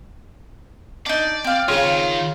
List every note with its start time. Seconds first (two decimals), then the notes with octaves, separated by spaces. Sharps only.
1.06 D4 D#4 D5
1.44 C4 F5
1.68 C#3 C#4 F4 F#4
1.85 D#3